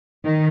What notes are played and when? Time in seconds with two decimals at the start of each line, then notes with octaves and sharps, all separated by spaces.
0.24 D#3